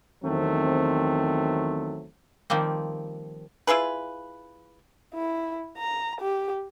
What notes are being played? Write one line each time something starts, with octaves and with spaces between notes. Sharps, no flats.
E2 D#3 F#3 A3 C4
D#3 F3 G3 A#3 C4
E4 F4 G#4 B4
E4
A#5
G4